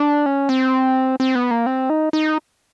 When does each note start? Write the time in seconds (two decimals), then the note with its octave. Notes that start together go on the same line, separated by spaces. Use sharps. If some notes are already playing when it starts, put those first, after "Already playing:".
Already playing: D4
0.26 C#4
0.49 C4
1.20 C4
1.35 B3
1.51 A#3
1.66 C4
1.90 D#4
2.13 D#4